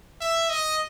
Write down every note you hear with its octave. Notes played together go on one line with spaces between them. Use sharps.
E5
D#5